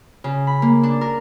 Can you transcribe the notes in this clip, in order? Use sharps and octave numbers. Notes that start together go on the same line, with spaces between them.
C#3
B5
A#3
D4
A#4